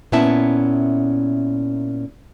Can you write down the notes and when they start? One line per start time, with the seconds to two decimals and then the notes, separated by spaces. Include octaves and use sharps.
0.12 A#2 B3 C#4 E4 E5 A5